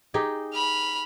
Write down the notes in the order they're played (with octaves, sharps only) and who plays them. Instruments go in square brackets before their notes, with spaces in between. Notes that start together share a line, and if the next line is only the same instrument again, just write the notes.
[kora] D#4 G4 G#4
[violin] B5 F6